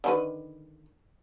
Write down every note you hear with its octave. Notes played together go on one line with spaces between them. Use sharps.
D3 D#3 B4